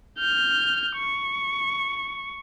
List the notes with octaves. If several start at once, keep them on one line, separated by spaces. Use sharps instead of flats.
F6 G6
C#6